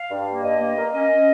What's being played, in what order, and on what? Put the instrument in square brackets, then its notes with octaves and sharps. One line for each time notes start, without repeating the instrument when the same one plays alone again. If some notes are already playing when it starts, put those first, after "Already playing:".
Already playing: [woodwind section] F5
G2
A#3
G2 D#5
A#3
A#3
C#4 D#5
C#4